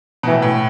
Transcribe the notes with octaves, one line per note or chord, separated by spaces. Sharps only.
B2
A2 E3
A2